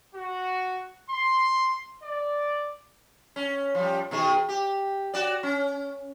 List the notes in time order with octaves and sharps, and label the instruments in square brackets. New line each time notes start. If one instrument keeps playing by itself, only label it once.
[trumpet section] F#4
C6
D5
[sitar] C#4
F3 G3
B2 D#3 G#4
G4
F#4 D5
C#4